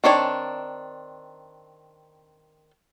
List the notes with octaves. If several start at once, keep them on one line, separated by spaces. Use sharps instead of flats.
D#3 C4 D4 C#5